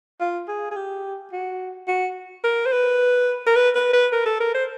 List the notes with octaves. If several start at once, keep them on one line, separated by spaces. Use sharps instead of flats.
F4
G#4
G#4
G4
F#4
F#4
A#4
C5
B4
A#4
B4
B4
B4
A#4
A4
A#4
C5